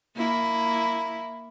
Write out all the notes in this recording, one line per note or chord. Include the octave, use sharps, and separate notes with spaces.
A#3 E4